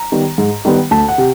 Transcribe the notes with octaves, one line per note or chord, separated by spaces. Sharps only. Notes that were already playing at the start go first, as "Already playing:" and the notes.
Already playing: A#5
D#3 G3 B3
G#2
D#3 G3 B3
D2 A5
F#5
C3